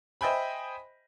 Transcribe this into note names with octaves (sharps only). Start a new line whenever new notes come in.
C5 D#5 E5 G5 G#5 B5